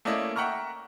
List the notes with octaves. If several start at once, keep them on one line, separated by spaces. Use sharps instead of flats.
A3 A#3 C#4 E4 D5 D#5
E5 F#5 G5 A#5 C#6 F6